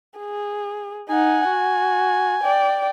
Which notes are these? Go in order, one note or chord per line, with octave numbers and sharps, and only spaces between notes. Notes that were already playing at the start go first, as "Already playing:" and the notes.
G#4
D#4 F#5 G#5
F#4
D5 G5